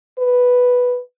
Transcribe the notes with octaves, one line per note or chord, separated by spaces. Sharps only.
B4